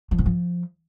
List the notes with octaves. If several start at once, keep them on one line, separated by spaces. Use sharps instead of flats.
F3
G#2
F3